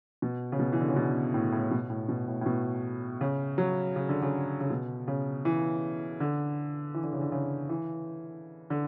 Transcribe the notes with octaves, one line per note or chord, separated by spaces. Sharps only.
B2
C#3
B2
E3
D3
C#3
B2
A2
A2
B2
A2
B2
A2
A2
B2
C#3
F#3
C#3
D3
C#3
C#3
B2
C#3
E3
D3
E3
D3
C#3
D3
C#3
E3
D3